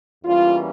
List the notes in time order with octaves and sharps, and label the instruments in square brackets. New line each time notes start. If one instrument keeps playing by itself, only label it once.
[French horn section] E2 E3 G3 A#3 C#4 F4